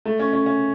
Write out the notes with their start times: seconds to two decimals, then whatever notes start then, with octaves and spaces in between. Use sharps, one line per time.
0.05 A3
0.19 C#4
0.33 C#4
0.46 C#4